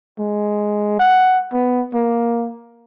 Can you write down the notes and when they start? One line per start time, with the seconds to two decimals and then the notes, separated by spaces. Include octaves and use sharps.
0.19 G#3
0.99 F#5
1.53 B3
1.94 A#3